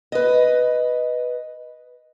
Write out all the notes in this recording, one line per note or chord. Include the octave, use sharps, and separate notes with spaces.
B4 D#5